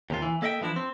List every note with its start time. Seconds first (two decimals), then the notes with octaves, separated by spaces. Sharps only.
0.10 D#2 C3 F4
0.22 E3
0.42 A#3 A4 D#5 E5 F#5 G5
0.61 E3 F3 D4 E4
0.76 C4